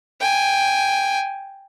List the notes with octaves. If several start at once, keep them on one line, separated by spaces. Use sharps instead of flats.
G5 G#5